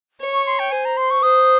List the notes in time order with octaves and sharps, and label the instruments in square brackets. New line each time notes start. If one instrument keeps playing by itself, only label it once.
[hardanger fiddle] C#5
[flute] C#6
C6
G5
[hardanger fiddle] C5 [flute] G#5
[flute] A#5
C6
C#6
[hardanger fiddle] C5 [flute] D#6